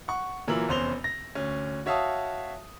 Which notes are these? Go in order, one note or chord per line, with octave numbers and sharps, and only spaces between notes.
F#5 C#6
A#2 E3 F#3 A#4 E6 F#7
F1 E2 C#4 C5 F7 G7
A#6
D2 C#4
F#4 C#5 E5 F5 A5 D#6